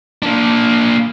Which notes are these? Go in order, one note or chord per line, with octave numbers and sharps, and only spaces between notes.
A#3 D4